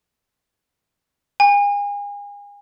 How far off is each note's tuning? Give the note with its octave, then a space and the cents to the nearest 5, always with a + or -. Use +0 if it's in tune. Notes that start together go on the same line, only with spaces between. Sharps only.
G#5 -35